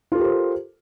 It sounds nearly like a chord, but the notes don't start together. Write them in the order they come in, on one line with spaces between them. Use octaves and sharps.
F4 A4 G4 A#4 C5